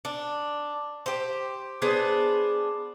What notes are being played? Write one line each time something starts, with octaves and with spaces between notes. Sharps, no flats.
D4
G4 C5
B3 D4 G#4 C5